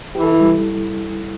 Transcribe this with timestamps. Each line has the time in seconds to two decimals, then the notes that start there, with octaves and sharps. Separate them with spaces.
0.15 E3 G4
0.23 A4
0.32 E4
0.40 G3